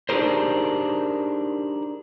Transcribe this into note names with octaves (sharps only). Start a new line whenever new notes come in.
D4 D#4 G4 G#4 A#4 C5